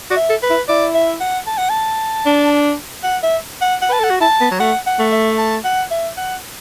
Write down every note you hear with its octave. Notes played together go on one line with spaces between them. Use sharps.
F#4 D5
E5
A4
B4
E4
E4 D5
E5
F#5
A5
F#5
A5
D4
F#5
E5
F#5
F#5
B4 A5
A4 F#5
F#4
E4 A5
B3
F#3
A3 F#5
F#5
A3
E5
A5
F#5
E5
F#5